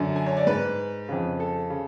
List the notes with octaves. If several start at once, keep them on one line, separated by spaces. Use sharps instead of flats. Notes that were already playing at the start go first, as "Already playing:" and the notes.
Already playing: F#2 D3
G#5
C#5
D5
G#2 B4
F2 C#3
A4
C#3